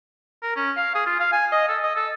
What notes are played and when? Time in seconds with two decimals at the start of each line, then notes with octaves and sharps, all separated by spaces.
0.43 A#4
0.56 C#4
0.77 F5
0.95 G#4
1.06 F4
1.20 F5
1.32 G#5
1.52 D#5
1.68 A4
1.83 D#5
1.96 A4